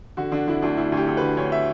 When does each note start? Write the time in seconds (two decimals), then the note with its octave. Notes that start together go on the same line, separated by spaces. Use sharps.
0.17 D3 F#4
0.32 D3 D4
0.47 D3 E4
0.62 D2 D4
0.77 D2 E4
0.92 D2
0.97 G4
1.07 D2
1.17 D3 B4
1.37 D2 C#5
1.52 E5